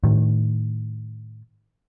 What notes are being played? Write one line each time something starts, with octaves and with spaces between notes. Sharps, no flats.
A2 D#3